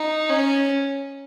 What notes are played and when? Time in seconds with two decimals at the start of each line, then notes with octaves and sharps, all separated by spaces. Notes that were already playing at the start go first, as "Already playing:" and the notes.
Already playing: D#4
0.29 C#4